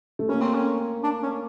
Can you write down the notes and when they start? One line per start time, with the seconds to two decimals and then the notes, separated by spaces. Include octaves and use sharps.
0.19 A3
0.29 A#3 C#4
0.42 C4
0.54 C#4
1.04 D4
1.23 C#4